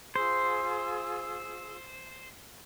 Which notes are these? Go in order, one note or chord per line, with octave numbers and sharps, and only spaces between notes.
F4 G#4 C5 E6